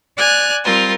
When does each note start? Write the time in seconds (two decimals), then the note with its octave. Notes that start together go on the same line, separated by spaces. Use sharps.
0.17 D5 G#5 F6 F#6
0.63 G3 C4 F4 A#4